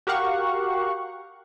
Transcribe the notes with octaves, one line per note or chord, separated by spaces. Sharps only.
F#4 G4 A#4 F5 F#5 C#6